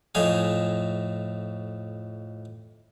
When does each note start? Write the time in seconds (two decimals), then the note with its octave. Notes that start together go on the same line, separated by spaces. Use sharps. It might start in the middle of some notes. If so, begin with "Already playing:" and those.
0.15 F2 A2 D#4 F5 G#5